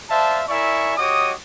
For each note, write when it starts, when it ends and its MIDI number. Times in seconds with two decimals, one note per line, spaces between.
0.10 0.44 72
0.10 0.44 74
0.10 0.44 76
0.10 0.44 77
0.10 0.44 81
0.49 0.94 64
0.49 0.94 70
0.49 0.94 74
0.49 0.94 76
0.49 0.94 80
0.49 0.94 85
0.98 1.33 66
0.98 1.33 67
0.98 1.33 73
0.98 1.33 75
0.98 1.33 86
0.98 1.33 87